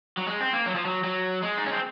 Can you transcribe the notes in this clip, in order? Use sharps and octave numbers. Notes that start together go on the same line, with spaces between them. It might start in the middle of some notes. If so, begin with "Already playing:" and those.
F#3
G#3
C4
A#3
F#3
F3
F#3
F#3
G#3
D#4
C#4
C4